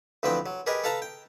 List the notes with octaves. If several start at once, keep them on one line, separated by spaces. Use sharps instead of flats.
D2 E3 F3 C4 B4 G5
F#3
G4 G#4 A#4 B4 D#5 G#5
A4 B4 F5 A5 A#5
G5